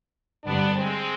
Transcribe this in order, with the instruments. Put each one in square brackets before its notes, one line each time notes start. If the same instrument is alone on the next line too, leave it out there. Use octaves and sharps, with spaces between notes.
[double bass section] G2 D3 G3 C4 [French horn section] B3 D4
[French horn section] G#3 C4